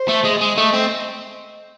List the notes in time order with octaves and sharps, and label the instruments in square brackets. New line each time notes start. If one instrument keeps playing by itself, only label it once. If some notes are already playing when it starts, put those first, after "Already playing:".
Already playing: [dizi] C5
[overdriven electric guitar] A3
G#3
G#3
[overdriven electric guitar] A3 [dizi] D#5
[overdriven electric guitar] C4